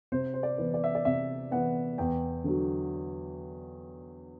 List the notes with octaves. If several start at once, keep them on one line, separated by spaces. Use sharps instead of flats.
C3 C5
C5
D5
E3 B3
D5
E5
D5
C3 E5
E3 B3 F#5
E2 G5
D3 F#3